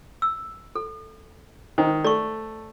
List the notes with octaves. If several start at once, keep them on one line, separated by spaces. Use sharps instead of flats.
E6
A4
D#3 C5
A3 D5 C#6